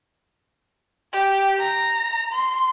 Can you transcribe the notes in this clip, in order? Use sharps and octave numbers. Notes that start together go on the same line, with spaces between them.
G4
A#5
C6